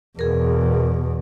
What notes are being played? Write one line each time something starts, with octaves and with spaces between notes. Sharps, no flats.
E2 B2 G#4 A#4